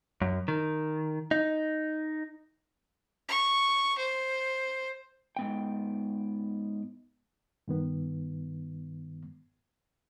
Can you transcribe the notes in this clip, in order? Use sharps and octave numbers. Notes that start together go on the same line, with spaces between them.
F#2
D#3
D#4
C#6
C5
G#2 B3 G5
G2 D#3 B3